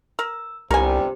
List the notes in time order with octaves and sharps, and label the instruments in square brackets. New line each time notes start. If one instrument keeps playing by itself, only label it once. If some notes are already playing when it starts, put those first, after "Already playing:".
[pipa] A#4 [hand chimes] E6
[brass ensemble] G1 C3 G3 [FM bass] C2 [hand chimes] G4 [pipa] A#4 G#5